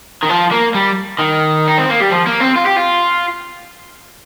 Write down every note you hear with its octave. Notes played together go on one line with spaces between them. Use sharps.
D#3
F3
A#3
G3
D#3
D#4
C4
A#3
G3
F3
A#3
C4
F4
G4
F4